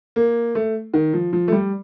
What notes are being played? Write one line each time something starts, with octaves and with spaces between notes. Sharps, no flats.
A#3
A3
D#3
F3
F3
A3
G3